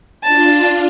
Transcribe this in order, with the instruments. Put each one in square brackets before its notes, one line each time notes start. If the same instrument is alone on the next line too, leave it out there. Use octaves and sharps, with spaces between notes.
[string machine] D4 F4 [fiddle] A5